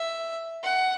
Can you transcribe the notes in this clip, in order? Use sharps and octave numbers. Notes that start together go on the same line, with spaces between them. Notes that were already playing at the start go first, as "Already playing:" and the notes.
Already playing: E5
F#5